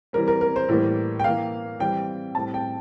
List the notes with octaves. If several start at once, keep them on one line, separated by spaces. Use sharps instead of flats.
E3 G3 C4 A#4
A#4
A#4
C5
A2 E3 G3 A#3
G5
E3 A#3 F5
E3 G3 C4 G5
A2 G3 C4 A5
G5